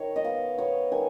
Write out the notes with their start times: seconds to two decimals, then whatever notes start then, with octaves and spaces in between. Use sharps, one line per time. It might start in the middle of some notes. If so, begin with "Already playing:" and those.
Already playing: D#3 C#5
0.16 D#5
0.24 B3 F5
0.58 B3 C#5
0.91 D#3 G#5